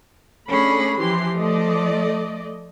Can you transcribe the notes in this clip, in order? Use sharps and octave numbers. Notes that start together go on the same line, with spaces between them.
A3 C#4 D4 G#4 B5
E3 F3 G4 C6
A3 D5 D#5